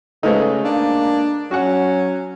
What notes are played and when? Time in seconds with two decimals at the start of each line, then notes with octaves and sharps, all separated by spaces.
0.23 C#3 G#3 A3 D#4 A4 B4 C5
0.64 A#3 D4
1.51 F#3 C#4 F#4 F#5